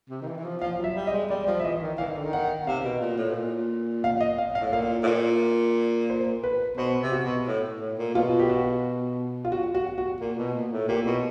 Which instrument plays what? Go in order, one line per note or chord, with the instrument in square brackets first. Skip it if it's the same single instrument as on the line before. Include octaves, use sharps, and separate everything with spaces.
[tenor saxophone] C3
D#3
E3
E3
F3
[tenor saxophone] F3 [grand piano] F5
[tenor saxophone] F#3
[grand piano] E5
[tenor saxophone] G3
[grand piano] D#5
[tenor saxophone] G#3
[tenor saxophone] G3 [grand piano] D5
[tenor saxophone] F3
[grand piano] E5
[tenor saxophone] E3 [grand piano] D#5
[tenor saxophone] D#3
[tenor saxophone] E3 [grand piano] F5
[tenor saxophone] D#3
D3
D#3
[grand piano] F#5
[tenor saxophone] C3 [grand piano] F5
[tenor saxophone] B2
A#2
A2
B2
A#2
[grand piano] F5
D#5
F5
F5
[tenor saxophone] A2
[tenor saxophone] A#2 [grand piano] F5
[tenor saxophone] A2
A#2
[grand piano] C5
B4
[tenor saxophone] B2 [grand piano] C5
[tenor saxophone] C3
[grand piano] F#4
[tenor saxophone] B2
A2
A2
A#2
[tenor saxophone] B2 [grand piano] F4
[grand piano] G4
F#4
F4
F#4
F#4
F#4
[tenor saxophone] A#2
B2
A#2
A2
[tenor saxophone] A#2 [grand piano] G4
[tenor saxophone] B2